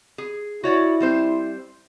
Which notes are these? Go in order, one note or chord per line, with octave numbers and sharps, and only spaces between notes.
G#4
E4 F#4 C#5 D5
G3 C4 C5